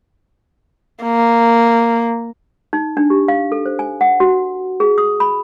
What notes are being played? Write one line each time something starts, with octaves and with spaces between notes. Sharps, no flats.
A#3
D#4
D4
G4
F5
A4
C5
G#5
F#5
F#4
G#4
D#6
B5